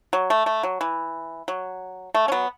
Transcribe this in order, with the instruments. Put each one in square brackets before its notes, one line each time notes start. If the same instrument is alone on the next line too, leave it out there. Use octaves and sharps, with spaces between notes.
[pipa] F#3
A3
A3
F#3
E3
F#3
A3
C#4
F#3 B3